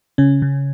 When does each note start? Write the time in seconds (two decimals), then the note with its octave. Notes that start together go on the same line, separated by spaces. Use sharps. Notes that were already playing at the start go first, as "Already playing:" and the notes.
0.18 C#3 C#4
0.42 C#3